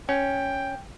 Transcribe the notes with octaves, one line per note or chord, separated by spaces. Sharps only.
C#4 G5